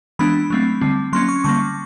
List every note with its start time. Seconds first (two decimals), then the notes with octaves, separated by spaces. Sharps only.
0.19 E3 G#3 B3 D4 B5
0.50 F#3 A3 C4
0.81 D3 G3 C4
1.13 F#3 A#3 C#4 C6
1.29 C#6
1.44 D3 G3 A#3 C#6